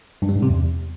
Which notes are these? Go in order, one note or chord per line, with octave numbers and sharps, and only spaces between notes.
G2
G3
G#2
C3
E2